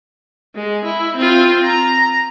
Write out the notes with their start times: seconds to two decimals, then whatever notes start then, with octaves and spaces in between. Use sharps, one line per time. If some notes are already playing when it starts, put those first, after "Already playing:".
0.56 G#3
0.85 E4
1.16 C4 F4
1.64 A#5